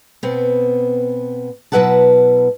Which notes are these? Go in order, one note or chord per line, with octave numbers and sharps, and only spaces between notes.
B2 B3 C4
B2 F#3 E4 B4 F#5 A5